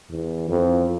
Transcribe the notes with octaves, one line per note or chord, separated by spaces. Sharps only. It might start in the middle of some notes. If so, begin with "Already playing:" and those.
E2
F2